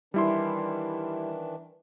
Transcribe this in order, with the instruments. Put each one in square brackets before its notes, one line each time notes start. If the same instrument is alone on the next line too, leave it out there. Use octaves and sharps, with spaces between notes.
[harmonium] D#3 E3 D4 [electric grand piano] G3 E4 C6